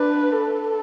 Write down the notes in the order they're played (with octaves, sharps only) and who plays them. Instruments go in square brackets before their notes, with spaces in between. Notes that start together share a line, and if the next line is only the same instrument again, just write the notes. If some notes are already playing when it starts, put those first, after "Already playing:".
Already playing: [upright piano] D4 [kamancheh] B4
[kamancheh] A4